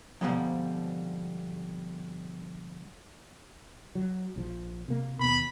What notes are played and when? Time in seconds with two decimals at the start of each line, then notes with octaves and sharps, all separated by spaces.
0.21 F2 G#2 B2 D3 F3 G3
3.95 F#3
4.36 A#1 F3
4.88 C3 A#3
5.20 D#2 B2 B5